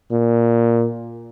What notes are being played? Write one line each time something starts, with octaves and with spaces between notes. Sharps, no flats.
A#2